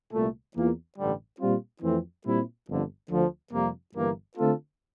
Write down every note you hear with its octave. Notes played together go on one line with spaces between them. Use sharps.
C2 A#2 A3
E2 E3 A#3 F4
A1 G2 D3 G3
A#2 G3 C4 F4
F2 E3 A3 C4
A#2 G3 C4 E4
G1 F2 D3
D2 D3 F3
F2 C3 G3 A#3
G1 G2 E3 A#3
D3 A3 C4 F4 A4